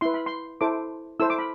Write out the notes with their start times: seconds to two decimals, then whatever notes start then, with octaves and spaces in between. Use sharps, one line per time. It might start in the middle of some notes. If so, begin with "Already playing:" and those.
0.01 E4 B4 C6
0.14 B5
0.26 C6
0.61 E4 A4 C5 D6
1.20 E4 A4 C5 E6
1.30 D6
1.38 B5